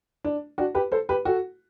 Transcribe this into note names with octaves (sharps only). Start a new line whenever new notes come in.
D4
D4 F#4
G4 B4
A4 C5
G4 B4
F#4 A4